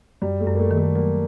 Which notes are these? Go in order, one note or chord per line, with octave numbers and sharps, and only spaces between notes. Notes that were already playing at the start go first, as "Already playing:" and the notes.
F#2 G3
A3
F#2
A#3
A3
D#3
A3
F#3 A#3